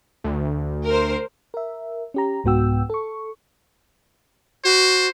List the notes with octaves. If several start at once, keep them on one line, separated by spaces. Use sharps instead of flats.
D2
A#4 C5
A#4 E5
C#4 G4 A#5
C2 G#2 B3 F#4 G5 E6
A4 C#6
F#4 C5